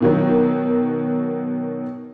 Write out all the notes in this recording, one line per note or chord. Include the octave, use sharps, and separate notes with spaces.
B2 D#3 F#3